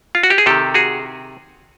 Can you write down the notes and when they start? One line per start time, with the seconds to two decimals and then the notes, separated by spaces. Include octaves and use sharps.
0.15 F4
0.23 F#4
0.30 G4
0.38 G#4
0.46 C3 D#3 G4 A4
0.74 F#4 G#4